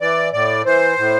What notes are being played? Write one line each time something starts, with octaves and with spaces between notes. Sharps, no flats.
E3 D5
A2 D5
E3 C5
A2